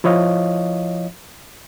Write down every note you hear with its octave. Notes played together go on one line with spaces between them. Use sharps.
F3 E4 C#5 D#5 F5